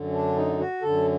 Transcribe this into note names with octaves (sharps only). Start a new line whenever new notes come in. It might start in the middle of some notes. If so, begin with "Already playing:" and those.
Already playing: F#2 D3
D4
D#4
F#4
F#2 D3 A4